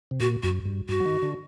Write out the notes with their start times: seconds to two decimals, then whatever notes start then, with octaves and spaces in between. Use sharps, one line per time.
0.11 C3
0.20 A#2 F#4
0.43 F#2 F#4
0.65 G2
0.89 G2 F#4
1.00 F#3
1.05 D#3
1.22 D3